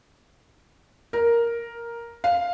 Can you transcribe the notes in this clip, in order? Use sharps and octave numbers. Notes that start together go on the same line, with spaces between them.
A#4
F5